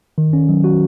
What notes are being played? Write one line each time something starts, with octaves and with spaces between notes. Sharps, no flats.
D#3
C#4
F#3
F#4